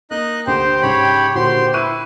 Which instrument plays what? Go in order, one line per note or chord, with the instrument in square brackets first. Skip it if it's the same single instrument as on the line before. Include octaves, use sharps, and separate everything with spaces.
[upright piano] A#3 [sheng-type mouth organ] D#4 D#5 F#6
[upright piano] D2 [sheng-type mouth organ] G4 C5 [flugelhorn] G5
[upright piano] G#2 C#3 [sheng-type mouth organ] G4 C#5 B5
[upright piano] A#2 D3 F#4 [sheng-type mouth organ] G4 C6 [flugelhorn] C5
[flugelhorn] E4 [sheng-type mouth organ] B4 [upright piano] C#6 F#6 D#7